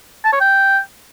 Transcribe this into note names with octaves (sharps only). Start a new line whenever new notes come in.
A5
C#5
G5